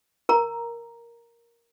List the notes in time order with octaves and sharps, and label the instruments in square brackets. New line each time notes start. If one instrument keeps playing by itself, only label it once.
[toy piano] A#4 A#5